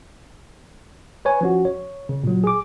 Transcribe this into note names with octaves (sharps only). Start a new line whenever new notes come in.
B4 C#5 G#5
F3 C#4 F#4
C#5
C#3
A#2 F#3
G#4 D6